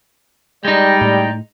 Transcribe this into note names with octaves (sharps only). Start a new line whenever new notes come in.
G3 G#3 D#4 D5 G5
A2